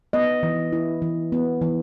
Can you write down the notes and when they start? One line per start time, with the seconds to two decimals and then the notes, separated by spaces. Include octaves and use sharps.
0.13 B3 D#5
0.43 E3
0.73 E4
1.02 E3
1.32 B3
1.61 E3